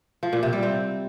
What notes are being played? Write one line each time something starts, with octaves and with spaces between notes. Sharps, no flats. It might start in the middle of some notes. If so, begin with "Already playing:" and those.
F3
A#2
C3
G3
C4